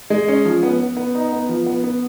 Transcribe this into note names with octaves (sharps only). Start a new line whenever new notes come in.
G#3
C#4
F3
B3
B3
B3
D#4
B3
F3
B3
B3